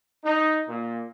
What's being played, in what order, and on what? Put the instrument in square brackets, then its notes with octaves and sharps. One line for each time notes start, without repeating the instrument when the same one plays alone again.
[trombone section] D#4
A#2